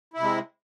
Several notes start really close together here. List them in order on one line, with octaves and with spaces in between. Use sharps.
E4 C3 G#3